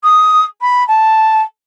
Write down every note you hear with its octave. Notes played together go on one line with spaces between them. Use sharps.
D#6
B5
A5